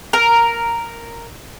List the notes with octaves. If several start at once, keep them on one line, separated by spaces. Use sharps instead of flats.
A#4